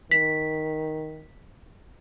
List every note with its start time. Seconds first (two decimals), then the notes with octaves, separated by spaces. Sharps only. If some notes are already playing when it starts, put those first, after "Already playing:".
0.11 D#3 B6